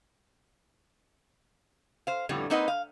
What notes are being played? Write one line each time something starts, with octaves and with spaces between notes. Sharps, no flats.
C5 F5
F2 A2 D3 G3 B3
A#3 C4 D#4 B4 D#5 F#5
F5